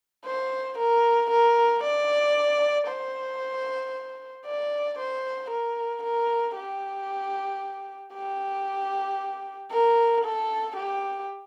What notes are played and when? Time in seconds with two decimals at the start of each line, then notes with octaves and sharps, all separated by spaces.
0.26 C5
0.78 A#4
1.31 A#4
1.83 D5
2.88 C5
4.46 D5
4.99 C5
5.51 A#4
6.03 A#4
6.56 G4
8.14 G4
9.71 A#4
10.24 A4
10.76 G4